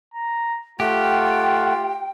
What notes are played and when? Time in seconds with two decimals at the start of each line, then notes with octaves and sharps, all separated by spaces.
0.14 A#5
0.80 A3 F4 G4 F#5 G5